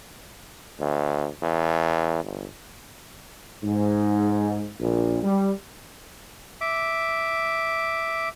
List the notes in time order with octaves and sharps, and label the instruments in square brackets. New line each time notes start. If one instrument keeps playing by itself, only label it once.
[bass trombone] D2
E2
G1
[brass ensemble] G#2
A#1
G3
[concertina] E5 D6